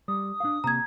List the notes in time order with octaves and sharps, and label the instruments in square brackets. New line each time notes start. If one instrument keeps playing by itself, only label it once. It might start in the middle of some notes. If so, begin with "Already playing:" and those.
[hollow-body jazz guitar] G3 [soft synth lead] D#6
[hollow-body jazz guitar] D4 F5
[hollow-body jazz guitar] C3 A#3 [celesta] A#5 G#6